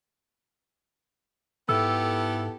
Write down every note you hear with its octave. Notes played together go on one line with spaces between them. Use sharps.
G#2 B3 E4 G4 A4 E6